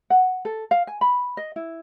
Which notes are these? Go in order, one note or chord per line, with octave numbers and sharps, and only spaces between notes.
F#5
A4
F5
G#5
B5
D#5
E4